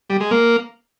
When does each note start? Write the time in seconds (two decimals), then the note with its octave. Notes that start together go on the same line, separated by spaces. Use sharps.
0.10 G3
0.20 G#3
0.31 A#3